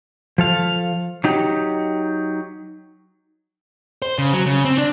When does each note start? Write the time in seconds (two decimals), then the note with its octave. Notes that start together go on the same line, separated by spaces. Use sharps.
0.38 F3 A4 F5
1.24 F#3 D#4 G4
4.02 C5
4.18 C#3
4.33 F#3
4.46 C#3
4.65 C4
4.78 D4